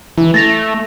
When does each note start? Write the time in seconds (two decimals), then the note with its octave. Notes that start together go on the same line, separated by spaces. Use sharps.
0.18 E3 E4
0.34 A3 A6 A#6 F7